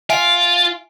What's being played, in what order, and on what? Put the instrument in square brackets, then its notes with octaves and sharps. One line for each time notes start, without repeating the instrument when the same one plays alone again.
[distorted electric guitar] F4 [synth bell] E5 G#5 D7